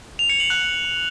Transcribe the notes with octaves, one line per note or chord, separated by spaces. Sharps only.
F7
C#7
F#7
F#6